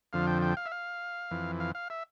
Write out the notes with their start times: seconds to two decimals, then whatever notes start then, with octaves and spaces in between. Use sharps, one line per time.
0.13 F2 D3 F3 F5
0.27 G5
0.42 G5
0.57 F5
0.66 E5
0.71 F5
1.31 F2 E3
1.60 F5
1.75 F5
1.90 E5